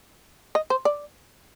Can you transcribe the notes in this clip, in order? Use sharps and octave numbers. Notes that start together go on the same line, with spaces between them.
D#5
C5
D5